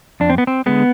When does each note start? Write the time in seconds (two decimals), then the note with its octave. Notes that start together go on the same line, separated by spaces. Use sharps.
0.20 F2 D4
0.30 C4
0.38 B3
0.47 C4
0.66 D3 G#3 B3